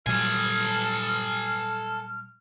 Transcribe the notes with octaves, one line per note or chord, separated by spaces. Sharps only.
A#2 F#3 G3 A4 G#5 F6